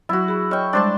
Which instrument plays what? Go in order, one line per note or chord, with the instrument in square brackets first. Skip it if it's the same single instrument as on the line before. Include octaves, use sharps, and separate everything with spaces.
[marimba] F#3 [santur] E4 F#4
[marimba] G#4 B5
[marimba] C#5 D#5 F6 [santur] G5 C#6
[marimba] G3 G#3 [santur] D4 C5 A5